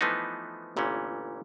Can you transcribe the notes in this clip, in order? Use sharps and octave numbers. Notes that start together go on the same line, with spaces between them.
E3 F3 A3 B3 D#4
G1 A#2 E3 A3 C#4